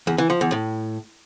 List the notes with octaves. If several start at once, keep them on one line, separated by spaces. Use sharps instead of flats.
E2
E3
F3
E2
A2